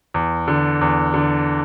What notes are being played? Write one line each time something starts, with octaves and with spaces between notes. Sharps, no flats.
E2
D3
E2
D3